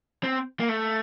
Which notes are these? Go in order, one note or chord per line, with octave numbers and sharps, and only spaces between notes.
C4
A#3
A3